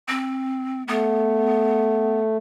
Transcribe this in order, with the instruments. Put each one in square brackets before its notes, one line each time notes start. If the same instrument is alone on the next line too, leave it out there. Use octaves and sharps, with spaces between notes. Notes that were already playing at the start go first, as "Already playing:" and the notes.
[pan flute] C4
[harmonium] A3 [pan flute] B3